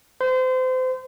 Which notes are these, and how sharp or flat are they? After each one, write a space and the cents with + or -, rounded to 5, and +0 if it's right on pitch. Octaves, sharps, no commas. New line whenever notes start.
C5 -30